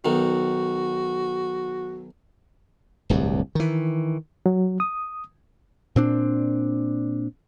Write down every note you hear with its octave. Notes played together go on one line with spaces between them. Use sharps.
B1 D#3 F#4
D1 C2 G2
D#3 E3
F#3
D#6
A#2 C4 D4